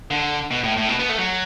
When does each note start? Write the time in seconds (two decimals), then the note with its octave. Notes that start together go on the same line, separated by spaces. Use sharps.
0.11 D3
0.51 B2
0.63 A2
0.77 A2
0.89 B2
0.99 B3
1.09 A3
1.18 F#3